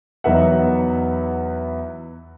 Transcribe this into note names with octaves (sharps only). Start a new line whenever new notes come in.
E2 F#3 B3 D#4 E5 F#5